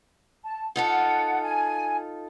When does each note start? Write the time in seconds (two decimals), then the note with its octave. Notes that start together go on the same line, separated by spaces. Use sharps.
0.43 A5
0.76 D#4 F4 A4 F#5
1.42 G#5